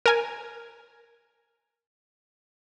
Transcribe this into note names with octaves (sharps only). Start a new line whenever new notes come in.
A#4 G#5